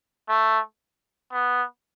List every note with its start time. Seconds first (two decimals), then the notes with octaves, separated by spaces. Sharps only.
0.29 A3
1.32 B3